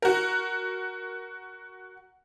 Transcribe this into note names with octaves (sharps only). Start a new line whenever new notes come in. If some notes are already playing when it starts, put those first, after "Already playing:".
F#4 A#4